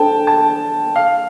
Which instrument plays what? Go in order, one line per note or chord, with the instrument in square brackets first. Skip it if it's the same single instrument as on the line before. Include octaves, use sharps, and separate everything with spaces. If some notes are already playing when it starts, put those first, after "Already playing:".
Already playing: [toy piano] D4 A4 C5 [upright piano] G5 A5
[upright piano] A5
F5